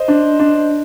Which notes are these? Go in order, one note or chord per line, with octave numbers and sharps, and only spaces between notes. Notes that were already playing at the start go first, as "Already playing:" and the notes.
Already playing: C5 D#5
D4
D4